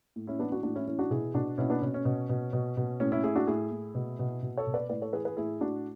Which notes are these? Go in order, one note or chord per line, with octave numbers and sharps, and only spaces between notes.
A2
C#4 E4
E3 B3 D4
D4 F#4
A2 D4 F#4
C#4 E4
E3 C#4 E4
D4 F#4
B2 E4 G#4
B2 D4 F#4
B2 C#4 E4
B3 D4
B2 C#4
C#4
B2
B2
B2
B2
A2 C#4
C#4 E4
A2 E4 G#4
D4 F#4
A2 E4 G#4
A2
B2
B2
B2
A4 C#5
B2
B4 D5
A2 B4 D5
A4 C#5
E3 G#4 B4
G#4 B4
A2 E4 G#4
A2 D4 F#4